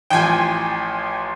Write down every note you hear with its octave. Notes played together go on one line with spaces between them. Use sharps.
A1 F3 G5 G#5